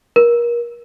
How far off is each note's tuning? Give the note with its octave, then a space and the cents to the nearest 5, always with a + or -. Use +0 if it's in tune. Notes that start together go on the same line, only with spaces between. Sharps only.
A#4 +30